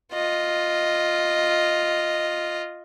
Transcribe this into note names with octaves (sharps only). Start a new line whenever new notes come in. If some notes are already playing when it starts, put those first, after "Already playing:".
F4 D#5